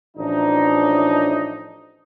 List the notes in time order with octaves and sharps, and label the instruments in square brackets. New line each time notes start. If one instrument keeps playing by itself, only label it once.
[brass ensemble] A1 F3 D4 D#4